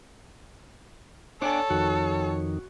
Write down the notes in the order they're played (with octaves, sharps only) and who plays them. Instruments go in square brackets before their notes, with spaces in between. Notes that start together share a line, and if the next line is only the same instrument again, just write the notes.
[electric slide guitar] D4 D5 G#5 [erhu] A4 [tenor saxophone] C#5 [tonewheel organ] F#5 D6
[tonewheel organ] F2 D#3 [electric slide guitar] F#4